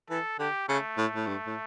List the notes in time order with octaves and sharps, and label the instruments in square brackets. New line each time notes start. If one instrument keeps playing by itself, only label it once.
[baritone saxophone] E3 [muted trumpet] A4
[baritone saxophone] D3 [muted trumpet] G4
[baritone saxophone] C#3 [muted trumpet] A3
[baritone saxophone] A2
A2
G2
A2